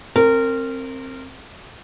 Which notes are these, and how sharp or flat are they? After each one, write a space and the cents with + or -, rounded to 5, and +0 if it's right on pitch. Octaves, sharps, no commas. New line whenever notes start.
C4 +20 A#4 -25